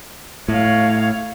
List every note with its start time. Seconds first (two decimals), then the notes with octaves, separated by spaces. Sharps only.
0.48 A2 C#5 F5